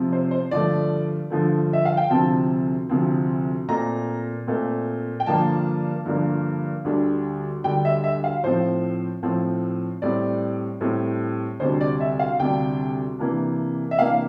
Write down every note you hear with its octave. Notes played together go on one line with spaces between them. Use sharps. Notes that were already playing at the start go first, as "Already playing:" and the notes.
Already playing: C3 F3 C4
C5
C5
G2 D3 F3 A3 D5
G2 D3 F3 A3
E5
F5
G5
D2 C3 F3 C4 A5
D2 C3 F3 C4
A#2 A3 C4 A#5
A#2 A3 C4
G5
G2 D3 F3 A#3 D4 A5
G2 D3 F3 A#3 D4
D2 D3 G3 D4
D2 D3 G3 D4 G5
E5
E5
F5
A2 F3 C4 C5
A2 F3 C4
A2 G3 C4 D5
A2 G3 C4
D2 C3 G3 D4 C5
D5
E5
F5
D2 C3 G3 D4 G5
C3 E3 A#3 D4
E5
C3 E3 A#3 D4 F5